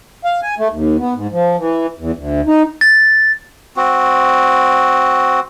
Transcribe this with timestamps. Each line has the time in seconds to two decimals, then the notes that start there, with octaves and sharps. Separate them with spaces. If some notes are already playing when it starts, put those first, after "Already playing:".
0.25 F5
0.43 G#5
0.58 A3
0.71 D#2
0.99 B3
1.14 G#2
1.32 F3
1.59 E3
1.99 E2
2.16 D2
2.47 D#4
2.81 A6
3.77 C4 F#4